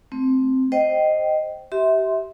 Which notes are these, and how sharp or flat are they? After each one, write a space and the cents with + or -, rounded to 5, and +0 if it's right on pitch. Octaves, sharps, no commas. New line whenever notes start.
A3 +0 C4 +0
C5 +0 D#5 -5 G5 -20
G4 -30 E5 -25 C6 +0